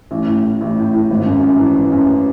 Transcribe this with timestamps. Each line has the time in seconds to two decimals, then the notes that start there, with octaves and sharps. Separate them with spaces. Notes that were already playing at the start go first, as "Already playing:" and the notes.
0.11 A1
0.27 A2
0.44 A2
0.61 A1
0.77 A2
0.93 A2
1.10 G#1
1.26 F#2
1.43 F#2
1.59 E3
1.75 E3
1.92 F#2